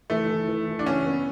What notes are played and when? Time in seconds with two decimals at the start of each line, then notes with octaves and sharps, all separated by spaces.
0.10 E3 A3
0.29 E3
0.48 E3
0.68 E3
0.79 D4
0.86 E3 C#4
1.06 B3